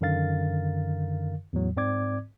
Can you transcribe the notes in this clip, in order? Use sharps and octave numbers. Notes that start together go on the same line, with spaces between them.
F#2 D3 D#3 A#4 F5 A6
E2 A2 F#3
G#2 C4 D5 D6 G#6